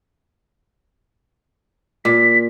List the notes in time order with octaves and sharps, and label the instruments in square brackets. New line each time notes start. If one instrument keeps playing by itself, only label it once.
[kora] A#2 [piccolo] B6